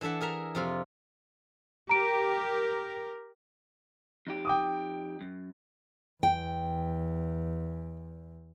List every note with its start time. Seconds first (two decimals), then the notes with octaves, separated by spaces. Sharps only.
0.01 E3 D4 A4 E5 F#5
0.21 G#4 A#4 E5 A#5
0.55 F2 C3 F4
1.89 G4 A#4 A#5 D7
4.27 F2 D#4 G4
4.45 G5 D6 D#6
5.21 F#2
6.23 E2 G5